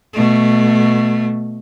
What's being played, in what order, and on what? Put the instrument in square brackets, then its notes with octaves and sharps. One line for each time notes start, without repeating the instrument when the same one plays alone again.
[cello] B2 A3